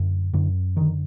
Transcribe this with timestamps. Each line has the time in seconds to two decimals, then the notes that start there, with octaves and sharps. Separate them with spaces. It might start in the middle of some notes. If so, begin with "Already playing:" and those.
Already playing: F#2 D3
0.33 F#2 D3
0.76 D3 D#3